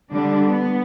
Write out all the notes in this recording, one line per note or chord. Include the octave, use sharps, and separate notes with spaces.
D3 G3 D4
B3